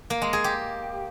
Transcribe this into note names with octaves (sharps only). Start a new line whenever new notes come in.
A#3
G#3
G#4
G4